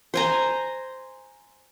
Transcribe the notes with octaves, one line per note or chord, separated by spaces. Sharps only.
C5 G#5 A#5